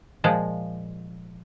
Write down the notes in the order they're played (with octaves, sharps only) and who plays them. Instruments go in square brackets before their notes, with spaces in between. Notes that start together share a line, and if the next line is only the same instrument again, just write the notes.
[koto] A#2 F3 G#3